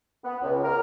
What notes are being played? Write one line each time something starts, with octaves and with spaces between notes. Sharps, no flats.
B3
C#2
A#4